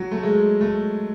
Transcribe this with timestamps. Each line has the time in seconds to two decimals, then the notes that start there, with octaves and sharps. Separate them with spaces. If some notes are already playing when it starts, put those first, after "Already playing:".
Already playing: F#3
0.12 A3
0.23 G#3
0.61 A3